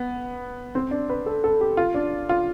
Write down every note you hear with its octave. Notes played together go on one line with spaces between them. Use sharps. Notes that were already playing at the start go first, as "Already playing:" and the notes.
Already playing: B3
C4
D4
B4
A4
A4
G4
F4
D4
F4